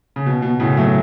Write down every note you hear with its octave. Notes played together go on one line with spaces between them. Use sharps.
C#3
B2
B2
A2 C#3
F#3 A3